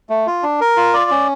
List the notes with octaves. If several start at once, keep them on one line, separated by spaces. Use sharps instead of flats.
A3
F4
D4
A#4
F4
D5
C#4